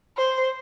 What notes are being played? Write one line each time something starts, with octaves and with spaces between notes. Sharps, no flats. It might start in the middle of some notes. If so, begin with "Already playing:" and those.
C5